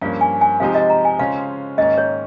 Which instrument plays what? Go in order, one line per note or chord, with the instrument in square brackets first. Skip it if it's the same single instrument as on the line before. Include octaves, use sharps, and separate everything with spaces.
[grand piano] G2 F3 A#3 C#4 [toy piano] F5
[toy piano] G#5
G#5
[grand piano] C3 F3 G#3 D#4 G4 [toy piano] F5
[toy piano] D#5
A#5
G#5
[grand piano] C#3 G#3 C#4 F4 C5 [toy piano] F5
[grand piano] G#2 D#3 A#3 C#4 [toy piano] D#5
[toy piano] C#5